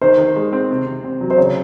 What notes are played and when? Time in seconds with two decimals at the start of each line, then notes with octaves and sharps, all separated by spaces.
0.02 D#3 C5
0.18 D#3
0.36 G#3
0.52 C4
0.70 C3
0.86 C3
1.04 C4
1.21 F#3
1.30 C5
1.37 C#3 C#5